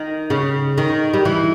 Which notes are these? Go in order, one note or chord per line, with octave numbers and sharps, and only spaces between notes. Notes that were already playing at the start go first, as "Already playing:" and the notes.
Already playing: D#3
C#3
D#3
G3
E3